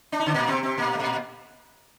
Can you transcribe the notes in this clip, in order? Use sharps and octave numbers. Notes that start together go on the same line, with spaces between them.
D4
D#4
D3 D4
A#2 A#3
C3 C4
C3 C4
A#2 A#3
A3
A#2 A#3